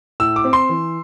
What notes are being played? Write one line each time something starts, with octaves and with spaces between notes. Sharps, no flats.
A2 E6
D6
C4
C6
E3